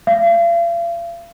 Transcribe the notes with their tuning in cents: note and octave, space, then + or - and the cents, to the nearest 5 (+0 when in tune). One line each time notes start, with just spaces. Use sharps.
F5 -40